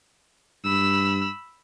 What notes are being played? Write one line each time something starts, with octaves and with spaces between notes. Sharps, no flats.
G2 B5 E6